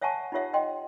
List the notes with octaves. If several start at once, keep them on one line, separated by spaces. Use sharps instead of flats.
C#5 E5 F#5 G#5 A5 C#6
D#4 F4 G4 C#5 E5 F#5
D#5 G5 C6